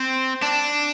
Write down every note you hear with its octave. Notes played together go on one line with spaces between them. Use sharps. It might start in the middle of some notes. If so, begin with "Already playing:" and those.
Already playing: C4
D4